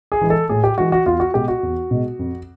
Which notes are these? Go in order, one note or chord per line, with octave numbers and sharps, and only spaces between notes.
G#4
E3 G#3
A4
A2 G#4
G4
E3 G#3 F#4
F#4
E2 F4
F#4
B2 G#3 G4
F#4
E2
B2 G#3
F2